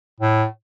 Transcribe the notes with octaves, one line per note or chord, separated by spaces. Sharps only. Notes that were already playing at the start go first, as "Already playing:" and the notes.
A2